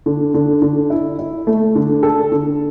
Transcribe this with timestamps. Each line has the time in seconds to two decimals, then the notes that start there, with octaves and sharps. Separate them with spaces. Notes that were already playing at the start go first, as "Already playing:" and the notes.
0.06 D3
0.34 D3
0.62 D3
0.90 E4
1.19 E4
1.47 A3
1.75 D3
2.03 A4
2.32 D3